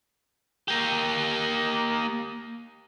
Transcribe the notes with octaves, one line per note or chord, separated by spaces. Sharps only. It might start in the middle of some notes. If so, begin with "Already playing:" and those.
A#3 G4